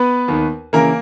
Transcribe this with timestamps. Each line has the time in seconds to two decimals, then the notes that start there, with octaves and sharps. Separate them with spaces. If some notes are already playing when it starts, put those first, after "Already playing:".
Already playing: B3 B4
0.28 D#2 D#3
0.73 C#3 E3 A#3 A#4